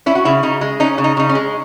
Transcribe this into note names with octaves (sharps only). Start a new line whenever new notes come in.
C#4 E4
F#4
C#3 E4
C#3 D#4
G#3
C#4 D#4
C#3
D#4
C#3 D#4
C#4
G#3